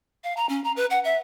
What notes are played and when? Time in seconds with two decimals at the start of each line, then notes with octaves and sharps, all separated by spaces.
0.24 F5
0.37 A#5
0.49 C#4
0.64 A#5
0.76 B4
0.90 F#5
1.04 E5